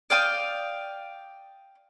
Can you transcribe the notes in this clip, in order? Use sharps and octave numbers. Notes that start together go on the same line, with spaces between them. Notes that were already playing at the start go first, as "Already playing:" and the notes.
D5 F5 G5 D#6